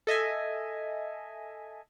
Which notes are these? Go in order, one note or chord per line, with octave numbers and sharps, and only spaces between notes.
A4 D#5 E5 G#5